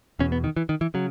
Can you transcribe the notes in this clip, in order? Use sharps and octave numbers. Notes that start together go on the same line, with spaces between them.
E2 B2 C#4
B3
D#3
E3
D#3
E3
C#3 F#3